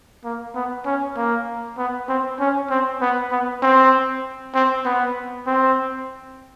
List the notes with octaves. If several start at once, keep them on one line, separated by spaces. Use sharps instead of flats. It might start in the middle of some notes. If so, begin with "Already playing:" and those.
A#3
B3
C#4
A#3
B3
C4
C#4
C4
B3
B3
C4
C4
B3
C4